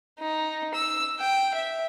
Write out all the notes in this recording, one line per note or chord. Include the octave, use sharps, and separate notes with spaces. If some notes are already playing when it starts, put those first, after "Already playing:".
D#4
E6
G5
E5